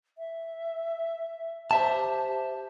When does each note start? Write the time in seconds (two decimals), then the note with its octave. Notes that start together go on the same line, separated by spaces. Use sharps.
0.18 E5
1.71 G4 C5 E5 A5